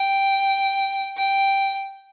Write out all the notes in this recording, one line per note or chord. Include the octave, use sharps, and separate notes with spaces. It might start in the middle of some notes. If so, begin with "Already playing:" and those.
Already playing: G5
G5